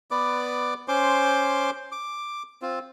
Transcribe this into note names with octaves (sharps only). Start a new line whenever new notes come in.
B3 B4 D5 D6
C#4 C5 C6 D6
D6
C4 F4